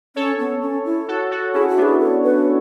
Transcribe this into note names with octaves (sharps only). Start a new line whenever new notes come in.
C#4 A4 C#5
B3
C#4
E4
F#4 A4
F#4 A4
C#4 E4 G#4
F#4
B3 D4 G#4
A4
B4